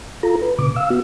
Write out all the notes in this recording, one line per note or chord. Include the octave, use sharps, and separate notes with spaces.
F4 A4 A#5
B4
A#2 C#3 D6
F5 E6
B3 F#4